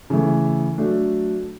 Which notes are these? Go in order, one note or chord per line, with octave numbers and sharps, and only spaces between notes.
C#3 E3 A3
F#3 A3 D4